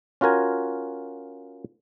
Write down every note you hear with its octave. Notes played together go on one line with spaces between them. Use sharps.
C#4 F4 F#4 A#4 G#5